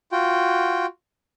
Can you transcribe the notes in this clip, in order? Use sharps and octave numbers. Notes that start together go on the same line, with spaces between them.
F4 F#4 G5